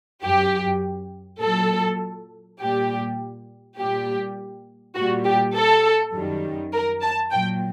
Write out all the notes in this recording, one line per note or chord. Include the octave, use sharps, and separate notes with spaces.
F#2 F#3 G4
A#2 F#3 A4
A#2 G3 G4
A#2 G3 G4
A#2 G3 F#4
G4
A4
F#2 D#3 G3
A#4
A5
A#2 F#3 G5